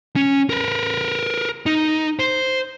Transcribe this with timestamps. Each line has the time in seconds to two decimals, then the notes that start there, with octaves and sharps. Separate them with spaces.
0.16 C#4
0.50 A#4 B4
1.66 D#4
2.19 C5